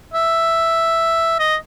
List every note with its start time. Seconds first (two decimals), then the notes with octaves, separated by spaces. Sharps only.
0.14 E5
1.39 D#5